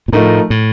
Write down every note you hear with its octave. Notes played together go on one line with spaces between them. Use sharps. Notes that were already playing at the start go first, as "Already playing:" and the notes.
A#2
A2 F3 A3 D#4 A#4
A2